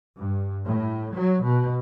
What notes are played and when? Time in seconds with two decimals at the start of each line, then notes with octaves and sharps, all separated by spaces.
0.17 G2
0.66 A2
1.14 F#3
1.43 B2